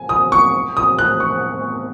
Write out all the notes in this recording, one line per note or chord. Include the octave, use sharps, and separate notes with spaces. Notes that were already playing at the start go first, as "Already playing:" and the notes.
Already playing: G#5
D#6
C#6
D#6
F#6
C#6